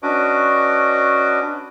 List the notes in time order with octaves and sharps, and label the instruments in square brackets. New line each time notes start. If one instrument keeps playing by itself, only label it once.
[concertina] C#4 D4 F#4 B4 D#5 D6